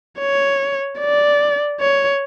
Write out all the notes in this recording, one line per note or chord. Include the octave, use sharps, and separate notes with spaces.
C#5
D5
C#5